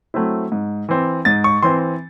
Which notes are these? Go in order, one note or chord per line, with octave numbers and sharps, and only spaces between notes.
F#3 A3 C4 E4
G#2
E3 C4
G#2 A6
C#6
E3 C4 C6